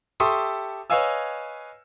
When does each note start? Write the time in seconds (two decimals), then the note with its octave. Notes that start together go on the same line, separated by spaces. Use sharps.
0.20 G4 A4 E5 C6 C#6 D#6
0.90 B4 C#5 D#5 F5 G#5 E6